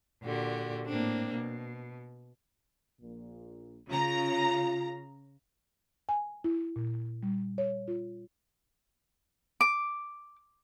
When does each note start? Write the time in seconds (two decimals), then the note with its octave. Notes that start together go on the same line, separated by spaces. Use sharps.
0.22 A#2 D3 F#4 G4
0.87 A2 A#3 C4 D4
1.33 B2
3.01 A#1 A#2
3.89 C#3 F4 A#5
6.09 G#5
6.44 E4
6.76 A#2
7.23 G3
7.58 C#5
7.88 F4
9.61 D6